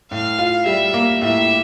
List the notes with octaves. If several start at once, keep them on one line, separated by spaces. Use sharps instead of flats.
A2 F5
F4
G3 E5
A#3
A2 E5